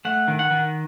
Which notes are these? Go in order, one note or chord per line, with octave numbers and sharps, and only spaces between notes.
A3 F#5
D#3
F#5
D#3